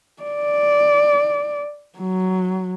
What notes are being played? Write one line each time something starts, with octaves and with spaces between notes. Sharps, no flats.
D5
F#3